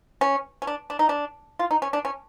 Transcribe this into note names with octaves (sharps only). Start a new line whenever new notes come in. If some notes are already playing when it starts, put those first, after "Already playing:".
C#4
C#4
D4
D4
D#4
D4
F4
D#4
C#4
D4
C#4